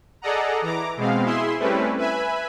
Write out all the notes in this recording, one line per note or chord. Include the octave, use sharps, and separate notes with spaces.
G#4 A4 D5 D#5 F#5 A#5
E3 A#5 D6
B2 G#3 B3 C4 F5
E4 G#4 E5 C6
G3 A3 C4 C#4 E4 B4
B4 E5 G#5 B5